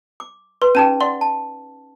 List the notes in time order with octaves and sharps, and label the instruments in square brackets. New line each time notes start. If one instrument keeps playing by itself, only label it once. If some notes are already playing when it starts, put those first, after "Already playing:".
[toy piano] D6
[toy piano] B4 [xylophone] C6
[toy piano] C#4 D#4 G#4 [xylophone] G5 A5 D#7
[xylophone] D5 C6 [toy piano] F#5
[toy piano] A5